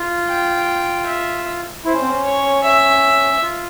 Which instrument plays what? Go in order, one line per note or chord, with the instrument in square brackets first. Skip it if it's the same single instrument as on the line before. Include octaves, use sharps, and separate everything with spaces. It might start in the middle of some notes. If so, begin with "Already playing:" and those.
Already playing: [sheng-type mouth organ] F4
[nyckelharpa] G5
E5
[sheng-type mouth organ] E4 [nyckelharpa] C5
[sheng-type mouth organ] C#4
C4
C#4
[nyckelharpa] C#5
E5
[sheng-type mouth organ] F4